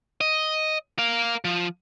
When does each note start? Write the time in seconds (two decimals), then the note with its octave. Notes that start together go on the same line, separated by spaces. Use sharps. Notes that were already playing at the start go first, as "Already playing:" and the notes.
0.21 D#5
0.99 A#4 F5
1.45 F3